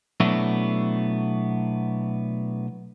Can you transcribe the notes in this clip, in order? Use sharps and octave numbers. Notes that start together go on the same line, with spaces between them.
B2 F#3 A3 B3 D4 E4